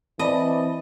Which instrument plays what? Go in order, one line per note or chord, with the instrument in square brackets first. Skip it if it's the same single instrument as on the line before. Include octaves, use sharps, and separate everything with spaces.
[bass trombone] E3 [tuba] C4 [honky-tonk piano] D5 A5 B5 [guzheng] D#5